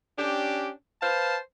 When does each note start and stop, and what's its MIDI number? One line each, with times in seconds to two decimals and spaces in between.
0.18 0.70 61
0.18 0.70 62
0.18 0.70 67
1.02 1.38 71
1.02 1.38 72
1.02 1.38 77
1.02 1.38 81